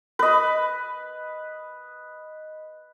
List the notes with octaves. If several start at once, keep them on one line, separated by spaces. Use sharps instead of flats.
B4 D#5